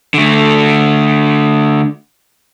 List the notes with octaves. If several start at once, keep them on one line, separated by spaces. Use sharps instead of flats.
D3 A3